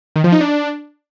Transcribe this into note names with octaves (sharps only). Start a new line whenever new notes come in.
D#3
F3
D#4
D4